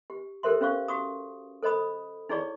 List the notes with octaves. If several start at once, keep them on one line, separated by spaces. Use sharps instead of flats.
G4
G4 A4 A#4 C5 E5 C6
C#4 C5 F5 C#6
F#4 C#6 D#6
A4 C5 D#5 B5 D#6
D#4 E4 G#4 C#5 D5 C#6